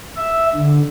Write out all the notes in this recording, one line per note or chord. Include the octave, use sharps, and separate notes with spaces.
E5
D3